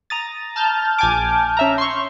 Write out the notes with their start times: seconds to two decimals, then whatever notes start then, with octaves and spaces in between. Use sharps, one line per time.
0.10 A#5 D#6 A6
0.56 A5 F6 G6
0.99 A#1 G#5 D6
1.57 C#4 E5 A#5
1.78 C6 C#6